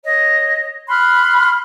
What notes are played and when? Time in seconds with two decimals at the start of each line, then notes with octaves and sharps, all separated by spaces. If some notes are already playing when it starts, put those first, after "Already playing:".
0.04 C#5 D#5
0.88 B5 C6 F6 F#6